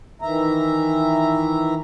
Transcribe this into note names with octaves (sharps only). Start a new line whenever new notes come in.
D#3 E3 E5 A#5